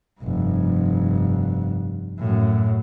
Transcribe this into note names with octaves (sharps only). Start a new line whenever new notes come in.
F1 G2
F#2 A2